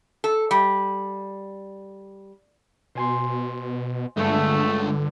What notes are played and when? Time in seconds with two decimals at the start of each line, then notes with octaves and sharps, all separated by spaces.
0.24 A4
0.51 G3
2.95 B2 C5 G#5 C6
4.17 G1 D3 G#3 A3 F4 A4